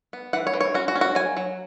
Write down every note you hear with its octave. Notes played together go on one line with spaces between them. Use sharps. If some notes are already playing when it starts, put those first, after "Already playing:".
B3
E3 F#5
C#5
E3
C#5
C#4 F#4
F#4
C#4
F#4
F#3 G#5
F#3